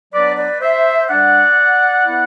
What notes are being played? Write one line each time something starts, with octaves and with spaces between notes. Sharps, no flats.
F#3 B3 D4 B4 D5
B4 D5
C5 E5
D3 G3 D4 D5 F#5
E3 B3 E4